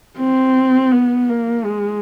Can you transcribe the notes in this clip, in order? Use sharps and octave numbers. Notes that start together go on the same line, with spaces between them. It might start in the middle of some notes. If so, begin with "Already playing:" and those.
C4
B3
A#3
G#3